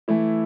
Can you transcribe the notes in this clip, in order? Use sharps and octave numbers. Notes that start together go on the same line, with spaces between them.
E3 A3 E4